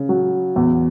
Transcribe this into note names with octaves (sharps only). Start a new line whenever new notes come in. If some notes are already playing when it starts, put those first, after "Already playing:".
Already playing: C#3
F#3
E2